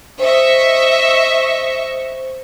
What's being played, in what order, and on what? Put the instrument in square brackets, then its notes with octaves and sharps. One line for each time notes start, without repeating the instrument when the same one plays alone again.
[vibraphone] C5 [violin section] D#5 E5 C#6